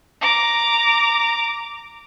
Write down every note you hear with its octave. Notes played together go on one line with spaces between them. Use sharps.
A#5 D6